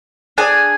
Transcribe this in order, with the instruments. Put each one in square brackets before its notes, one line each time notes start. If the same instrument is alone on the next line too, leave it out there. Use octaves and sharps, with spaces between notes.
[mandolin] D4 G#4 G#5